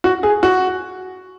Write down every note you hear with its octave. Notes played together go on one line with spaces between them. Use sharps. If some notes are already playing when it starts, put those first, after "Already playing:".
F#4
G#4
F#4